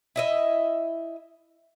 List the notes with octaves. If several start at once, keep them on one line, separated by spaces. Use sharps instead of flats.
E4 D#5 E5